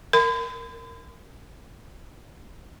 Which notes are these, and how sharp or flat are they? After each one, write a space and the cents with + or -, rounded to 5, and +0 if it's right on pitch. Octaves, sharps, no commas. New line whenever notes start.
A#4 -15 B5 +45